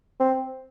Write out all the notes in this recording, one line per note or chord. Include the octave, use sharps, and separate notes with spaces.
C4